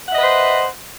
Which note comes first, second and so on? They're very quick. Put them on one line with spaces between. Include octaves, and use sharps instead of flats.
F#5 E5 D#5 B4 C5